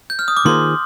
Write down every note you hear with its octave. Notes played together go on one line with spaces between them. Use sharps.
G6
F6
D#6
D6
D#3 A#3 F4 G#4 C5 C6